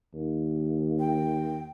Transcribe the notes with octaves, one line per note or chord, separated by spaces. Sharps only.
D#2
G5